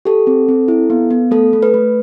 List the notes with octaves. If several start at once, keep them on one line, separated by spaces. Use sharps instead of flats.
G4 A4
C4
C4
E4
B3
B3
A3 A4
A3
B4
A3